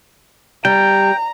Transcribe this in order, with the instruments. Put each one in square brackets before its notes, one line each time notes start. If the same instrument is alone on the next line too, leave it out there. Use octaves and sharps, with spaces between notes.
[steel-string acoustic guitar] G3 [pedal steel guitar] G5 [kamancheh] A#5